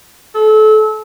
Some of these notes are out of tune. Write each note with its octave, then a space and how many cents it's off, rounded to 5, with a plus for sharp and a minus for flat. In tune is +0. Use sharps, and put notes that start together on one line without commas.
A4 -30